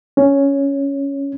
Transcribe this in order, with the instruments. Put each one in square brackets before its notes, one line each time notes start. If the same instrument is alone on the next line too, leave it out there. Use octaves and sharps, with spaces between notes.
[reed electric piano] C#4